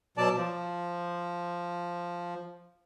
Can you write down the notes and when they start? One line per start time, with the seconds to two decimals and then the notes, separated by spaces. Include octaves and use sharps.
0.18 B2 F#3 D5 A5
0.36 F3